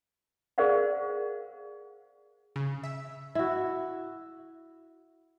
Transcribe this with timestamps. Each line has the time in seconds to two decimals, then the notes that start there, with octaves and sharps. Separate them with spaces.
0.58 G#4 A#4 C5 D5 F5 F#5
2.56 C#3
2.84 E5
3.35 E4 F#4